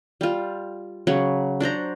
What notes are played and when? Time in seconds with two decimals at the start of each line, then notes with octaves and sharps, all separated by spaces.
0.21 G3 F4
1.07 C#3 F#3 C#5
1.60 D4 F#4 C5 A#5